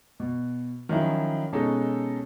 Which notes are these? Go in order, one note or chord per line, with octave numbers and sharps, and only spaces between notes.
B2
D#3 F3 F#3 C#4 E4
B2 G#3 C#4 D#4 A4